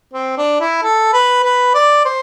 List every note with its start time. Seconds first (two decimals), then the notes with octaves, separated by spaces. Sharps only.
0.14 C4
0.38 D4
0.61 E4
0.83 A4
1.13 B4
1.44 B4
1.75 D5
2.05 C5